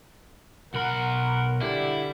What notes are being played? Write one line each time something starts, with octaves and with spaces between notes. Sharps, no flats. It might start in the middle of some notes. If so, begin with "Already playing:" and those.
B1 A#4 F#5 B5
D3 G3 E4